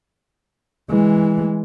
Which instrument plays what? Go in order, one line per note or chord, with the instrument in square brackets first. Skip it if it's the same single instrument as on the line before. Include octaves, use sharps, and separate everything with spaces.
[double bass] E3 G#3